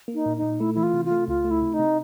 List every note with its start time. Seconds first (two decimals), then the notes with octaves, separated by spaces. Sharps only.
0.08 A#3
0.14 D#4
0.26 A#2
0.37 D#4
0.42 A#2
0.60 A3 E4
0.74 E3 E4
0.83 F4
0.94 C3
1.05 F4
1.11 A3
1.28 C#2 F4
1.44 A3
1.51 E4
1.62 C3
1.73 D#4
1.79 C3